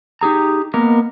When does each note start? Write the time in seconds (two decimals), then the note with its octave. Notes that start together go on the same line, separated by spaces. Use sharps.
0.21 D#4 G4 G#4 A#5
0.74 A#3 B3 A#4 D#5